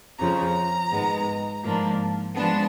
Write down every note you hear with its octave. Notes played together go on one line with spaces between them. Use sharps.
F2 C#3 F3 A#5
G#2 D#3 G#3 B3
G#2 F3 A#3 D4
F3 G#3 B3 D4 A5